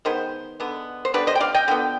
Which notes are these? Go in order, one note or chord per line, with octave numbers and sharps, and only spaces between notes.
D#3 G#3 B3 C5
D3 G#3 B3
C5
D3 G3 B3 B4 D5
C5 D#5
G5
D5 F5
D#5 G5
D3 F3 B3 G5